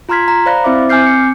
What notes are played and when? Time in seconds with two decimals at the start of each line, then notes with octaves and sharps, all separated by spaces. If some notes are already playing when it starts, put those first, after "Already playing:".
0.09 F4 A#5 C6 F6 G#6 B6
0.28 A#5
0.46 C5 D5 F5 B5 F#6 A#6
0.64 C4 E4 C5 E5 D6
0.89 C4 G#5 D6 F6 G6 C7
1.07 C#7